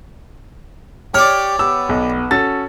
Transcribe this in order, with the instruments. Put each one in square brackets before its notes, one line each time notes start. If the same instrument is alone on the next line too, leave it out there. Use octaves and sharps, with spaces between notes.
[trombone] G4 [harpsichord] C#5 D5 [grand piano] F6
[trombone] B3 [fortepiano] G4 [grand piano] E6
[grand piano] B1
[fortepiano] C#4 F#4 A4 [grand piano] A6